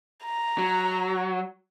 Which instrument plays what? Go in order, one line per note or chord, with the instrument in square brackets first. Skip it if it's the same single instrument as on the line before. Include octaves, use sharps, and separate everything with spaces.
[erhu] A#5
[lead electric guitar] F#3